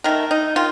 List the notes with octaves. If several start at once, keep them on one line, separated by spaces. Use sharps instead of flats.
D#3 A3 A#4
D#4
D#3 F4